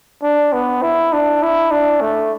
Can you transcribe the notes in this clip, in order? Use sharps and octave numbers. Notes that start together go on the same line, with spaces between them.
D4
B3
E4
D4
E4
D4
A3